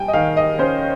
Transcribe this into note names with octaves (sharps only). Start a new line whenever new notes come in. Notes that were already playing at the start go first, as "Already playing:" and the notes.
Already playing: G3 G5 G#5
D#5
D#3 F5
D#5
C#4 C5